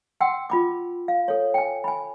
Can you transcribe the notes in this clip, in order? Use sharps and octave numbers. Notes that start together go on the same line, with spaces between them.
F#5 G5 C6 E6
F4 B5 D6
F5
A4 C#5
G5 G#5
G#5 B5